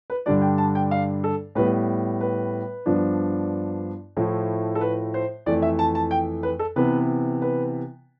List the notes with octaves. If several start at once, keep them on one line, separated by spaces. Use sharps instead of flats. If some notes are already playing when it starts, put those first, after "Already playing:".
B4
G2 D3 G3 D4 D5
G5
A5
G5
F5
A4
A2 G3 B3 B4
B4
G2 F3 B3 D4
A2 F3 A3 E4
A4
B4
C5
F2 E3 A3 D5
E5
A5
A5
G5
B4
A4
C3 E3 B3 B4
B4